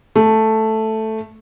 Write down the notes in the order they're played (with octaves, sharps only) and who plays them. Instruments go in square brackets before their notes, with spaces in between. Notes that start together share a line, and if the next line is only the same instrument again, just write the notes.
[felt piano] A3